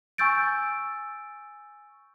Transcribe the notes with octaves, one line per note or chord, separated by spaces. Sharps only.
G#5 C#6 E6 G6 A6 D7